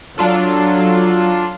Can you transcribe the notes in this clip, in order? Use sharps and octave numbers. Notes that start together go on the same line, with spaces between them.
F#3 D4 F4 A4